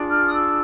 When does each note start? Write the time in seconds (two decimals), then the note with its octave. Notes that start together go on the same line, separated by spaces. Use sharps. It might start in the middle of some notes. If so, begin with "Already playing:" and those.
Already playing: D4 F4 G#4
0.09 F6
0.26 D#6
0.33 E6